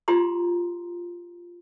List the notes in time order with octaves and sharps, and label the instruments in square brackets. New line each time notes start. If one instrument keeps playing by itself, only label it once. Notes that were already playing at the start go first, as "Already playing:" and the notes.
[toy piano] F4 G4 A#5 C6